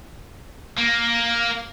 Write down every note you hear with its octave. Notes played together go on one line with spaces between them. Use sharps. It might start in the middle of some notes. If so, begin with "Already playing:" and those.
A#3